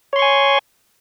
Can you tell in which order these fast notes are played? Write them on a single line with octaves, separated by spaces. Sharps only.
C#5 C6 C#6 G#5